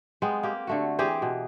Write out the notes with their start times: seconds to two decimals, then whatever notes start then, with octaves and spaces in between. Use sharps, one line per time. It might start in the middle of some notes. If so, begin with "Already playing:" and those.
0.22 G#3 B3 C4
0.43 A#3 G4
0.67 D3 A3 F#4
0.99 E3 C4 G4 G#4
1.22 B2